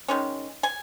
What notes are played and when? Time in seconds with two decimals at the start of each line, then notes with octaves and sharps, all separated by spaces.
0.08 D#3 G#3 C#4
0.63 G#5